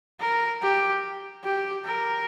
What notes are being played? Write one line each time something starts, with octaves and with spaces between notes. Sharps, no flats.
A#4
G4
G4
A#4